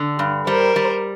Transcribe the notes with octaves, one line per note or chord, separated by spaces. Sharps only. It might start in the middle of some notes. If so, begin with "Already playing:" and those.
Already playing: D3
G2
G3 A#4 C5
G3